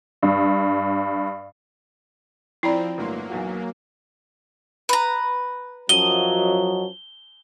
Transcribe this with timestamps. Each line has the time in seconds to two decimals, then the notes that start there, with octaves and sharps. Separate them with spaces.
0.23 G2
2.63 F3 C4 E4 D5 G5 A#5 B5
2.98 G1 A2 F#3 A#3 C6
3.30 B1 E2 F#4
4.89 B4 A#5
5.89 F#2 F3 F#3 D#5 G7